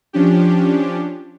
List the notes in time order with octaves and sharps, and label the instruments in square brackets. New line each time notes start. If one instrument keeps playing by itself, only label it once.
[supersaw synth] F3 C#4 D4 G4